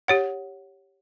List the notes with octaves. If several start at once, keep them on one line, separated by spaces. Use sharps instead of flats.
G4 C#5 F#5